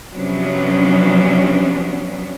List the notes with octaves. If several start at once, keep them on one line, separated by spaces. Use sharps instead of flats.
C3 F3 F#3 B3 C#4 D4